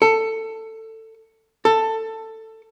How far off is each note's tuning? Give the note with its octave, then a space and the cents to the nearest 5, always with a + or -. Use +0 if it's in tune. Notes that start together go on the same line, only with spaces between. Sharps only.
A4 +15
A4 +15